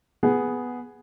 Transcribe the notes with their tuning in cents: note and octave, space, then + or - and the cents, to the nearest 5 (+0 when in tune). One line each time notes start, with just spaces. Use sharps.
B3 +0 G#4 +0